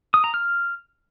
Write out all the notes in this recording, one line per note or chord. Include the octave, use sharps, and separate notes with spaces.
D#6
A#5
F6